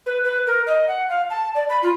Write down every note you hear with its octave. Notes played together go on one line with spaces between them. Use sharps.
B4
B4
A#4
D#5
F#5
F5
A5
D5
B5
F4